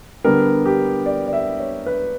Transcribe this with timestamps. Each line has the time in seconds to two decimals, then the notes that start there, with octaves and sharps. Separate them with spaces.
0.24 D3 G3 B3 A#4
0.66 G4
1.06 D5
1.26 D5
1.33 E5
1.60 C#5
1.86 B4